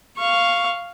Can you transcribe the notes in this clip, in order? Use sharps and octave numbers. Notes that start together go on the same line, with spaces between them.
F5 C#6